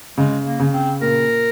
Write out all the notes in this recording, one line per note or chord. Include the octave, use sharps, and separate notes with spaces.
C#3 G#3
A#3
C#3
C4
A#2 A#4